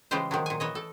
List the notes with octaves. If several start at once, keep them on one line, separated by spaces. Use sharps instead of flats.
C#3 E3 G#3 F4 G4 C5
D#3 F3 F#3
A#2 G#5
E3 C#5 D#5
A4